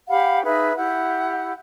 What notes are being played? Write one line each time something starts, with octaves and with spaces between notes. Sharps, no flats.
G4 F5 F#5 B5
D#4 G#4 B4 E5
E4 G4 F#5